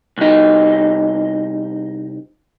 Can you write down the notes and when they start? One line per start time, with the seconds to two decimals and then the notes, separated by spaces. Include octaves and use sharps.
0.18 C2 D#4